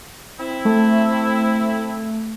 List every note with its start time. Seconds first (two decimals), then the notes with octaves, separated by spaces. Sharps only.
0.39 C4 E4
0.65 A3